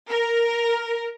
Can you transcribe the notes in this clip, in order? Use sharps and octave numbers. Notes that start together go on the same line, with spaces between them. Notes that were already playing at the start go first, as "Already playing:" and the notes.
A#4